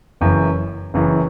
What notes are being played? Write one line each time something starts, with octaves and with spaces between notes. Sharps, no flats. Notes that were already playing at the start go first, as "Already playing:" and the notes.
F#1 F#2 E3
F#1 F#2 E3